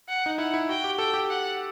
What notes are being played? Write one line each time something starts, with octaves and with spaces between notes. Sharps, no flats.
F#5
D#4
E4 F#5
E4
F#4 G5
G4
A4 G5
G4
F#5